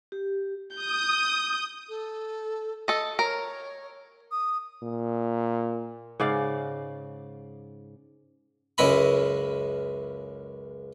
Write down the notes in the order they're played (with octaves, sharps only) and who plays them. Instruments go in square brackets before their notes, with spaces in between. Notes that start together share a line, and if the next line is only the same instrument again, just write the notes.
[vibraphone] G4
[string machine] D#6 [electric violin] G6
[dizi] A4
[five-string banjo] A4 D#5
[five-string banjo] A#4 [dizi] C#5
[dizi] D#6
[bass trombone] A#2
[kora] G#2 C#3 D5 F5
[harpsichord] C#2 F#2 G#3 E4 A#5 B5